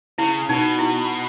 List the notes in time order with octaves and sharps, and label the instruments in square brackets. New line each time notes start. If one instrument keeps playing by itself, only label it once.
[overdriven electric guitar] C#3 [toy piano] E4
[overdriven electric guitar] B2 [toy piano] D#4
[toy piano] E4